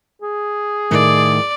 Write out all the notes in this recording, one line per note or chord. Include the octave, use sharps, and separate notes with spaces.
G#4
A2 D#3 D5